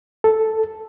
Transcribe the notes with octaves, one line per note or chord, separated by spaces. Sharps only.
A4